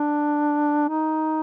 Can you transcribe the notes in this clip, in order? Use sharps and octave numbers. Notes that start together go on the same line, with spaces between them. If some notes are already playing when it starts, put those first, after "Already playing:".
Already playing: D4
D#4